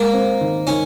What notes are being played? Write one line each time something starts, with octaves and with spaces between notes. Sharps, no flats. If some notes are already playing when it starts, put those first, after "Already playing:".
Already playing: G#3 A#3
C4
D#3
D#3 C#4